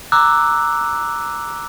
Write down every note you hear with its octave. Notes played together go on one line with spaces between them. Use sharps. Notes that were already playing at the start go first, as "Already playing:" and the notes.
A#5 D6 E6 F#6